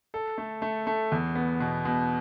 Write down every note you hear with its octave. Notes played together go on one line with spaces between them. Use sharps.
A4
A3
A3
A3
E2
B3
B2
B2